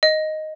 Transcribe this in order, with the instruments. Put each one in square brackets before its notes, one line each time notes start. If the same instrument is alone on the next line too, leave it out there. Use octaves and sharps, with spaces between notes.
[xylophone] D#5